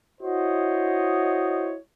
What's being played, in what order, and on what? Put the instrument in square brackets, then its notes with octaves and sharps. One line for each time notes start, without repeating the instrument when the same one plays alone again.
[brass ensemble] E4 F#4 C5 C#5 D#5